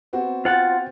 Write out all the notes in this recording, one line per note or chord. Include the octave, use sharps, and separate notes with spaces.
B3 C4 F#4
F4 C5 F#5 G5 A6